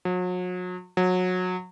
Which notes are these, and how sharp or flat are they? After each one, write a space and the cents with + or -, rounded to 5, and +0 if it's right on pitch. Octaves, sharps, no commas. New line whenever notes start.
F#3 -35
F#3 -20